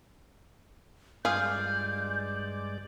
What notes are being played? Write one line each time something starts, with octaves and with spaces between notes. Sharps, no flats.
G2 G#3 F4 G#4 D5 F5 G6